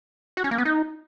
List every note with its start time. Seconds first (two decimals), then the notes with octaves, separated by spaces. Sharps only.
0.37 F#4
0.44 C#4
0.51 A#3
0.58 B3
0.65 D#4